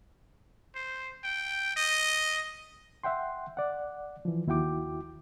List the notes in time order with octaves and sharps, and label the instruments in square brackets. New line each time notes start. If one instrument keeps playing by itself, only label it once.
[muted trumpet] C5
G5
D#5
[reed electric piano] E5 F#5 G5 C6
D5 F#5
E3 F3
D#2 E4 F#4 G5 D6